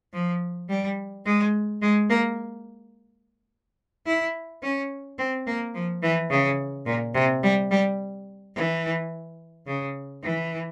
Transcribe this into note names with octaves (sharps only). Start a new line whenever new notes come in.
F3
G3
G#3
G#3
A#3
E4
C#4
C4
A#3
F3
E3
C#3
A#2
C3
G3
G3
E3
C#3
E3